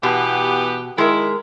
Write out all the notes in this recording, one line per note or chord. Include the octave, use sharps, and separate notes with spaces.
B2 E3 B3 G4
D#3 G#3 E4 A#4